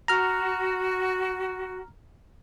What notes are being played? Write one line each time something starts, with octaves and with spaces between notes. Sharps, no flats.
F#4 A#5 F6